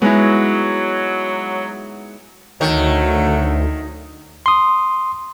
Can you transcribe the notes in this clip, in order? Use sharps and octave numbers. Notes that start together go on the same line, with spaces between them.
F#3 G#3 B3 D#4 E4
D2 D#3 F#3 A3
C6 D#6